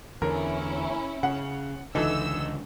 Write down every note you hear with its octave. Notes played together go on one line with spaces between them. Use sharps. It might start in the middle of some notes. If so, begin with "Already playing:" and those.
E2 D3 C#4 E4 A#4
C#3 F#5
C#2 D3 E3 D#4 A4 E6